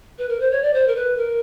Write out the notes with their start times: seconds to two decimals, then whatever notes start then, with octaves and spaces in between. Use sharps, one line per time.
0.18 B4
0.29 A#4
0.40 C5
0.51 C#5
0.62 D5
0.74 C5
0.87 A#4
0.96 B4
1.17 A#4